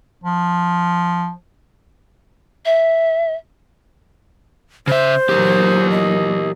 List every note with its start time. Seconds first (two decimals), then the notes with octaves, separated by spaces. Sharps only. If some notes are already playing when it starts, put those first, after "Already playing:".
0.24 F3
2.66 E5
4.87 C#3 C5 E5
5.29 A#2 E3 F#3 G4 A#4
5.90 D#5